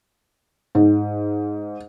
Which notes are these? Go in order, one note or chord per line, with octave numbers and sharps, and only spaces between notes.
G#2